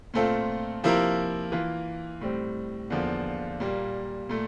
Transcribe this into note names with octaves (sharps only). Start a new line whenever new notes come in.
A#2 A3 C4 F4 A4
C3 F3 A#3 E4 A#4
E3 A#3 F4
A2 G3 C4
E2 D3 F3 A#3
A#2 G3 A#3
A#2 A3